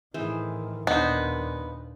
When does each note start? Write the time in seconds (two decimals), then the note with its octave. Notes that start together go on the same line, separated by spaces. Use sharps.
0.14 A2 D#3 E3 G#4 C5
0.87 D#2 A#2 B3 D4 D#4 C5